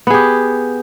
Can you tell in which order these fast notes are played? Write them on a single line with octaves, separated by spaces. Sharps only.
B3 G#4 G4